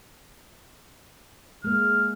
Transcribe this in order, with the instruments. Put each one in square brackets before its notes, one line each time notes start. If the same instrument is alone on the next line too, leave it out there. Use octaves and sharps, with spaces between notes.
[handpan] G#3 A#3 [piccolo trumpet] F6